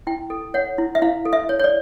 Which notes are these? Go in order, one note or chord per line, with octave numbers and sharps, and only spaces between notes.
E4 G5
A4
C#5 F#5
E4
E5
E4 F5
A4
E5
C#5
C#5
D5